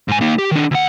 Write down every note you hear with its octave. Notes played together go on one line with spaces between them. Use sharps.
G#2 G#5
A#3 D#4
G4
D#3 D4
D2 F#5